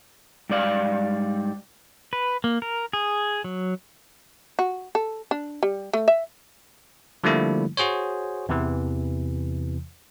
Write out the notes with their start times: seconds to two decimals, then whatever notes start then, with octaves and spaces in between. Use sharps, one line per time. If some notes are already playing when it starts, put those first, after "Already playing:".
0.50 G#2 G3 D5 F5
2.13 B4
2.44 A#3
2.62 A#4
2.93 G#4
3.44 F#3
4.59 F#4
4.95 A4
5.31 D4
5.63 G3
5.93 A3
6.08 E5
7.24 D3 F3 G3 A3 A#3 E4
7.77 F#4 G#4 C5 C#5
8.49 E2 C3 E3